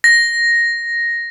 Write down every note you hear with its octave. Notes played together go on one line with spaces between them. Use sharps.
A#6